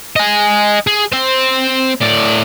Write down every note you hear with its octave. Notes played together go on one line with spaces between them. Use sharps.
D#5 G#5
G#4
C4 C5
A2 D5